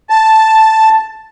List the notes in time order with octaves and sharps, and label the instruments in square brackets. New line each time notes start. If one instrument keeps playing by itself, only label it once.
[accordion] A5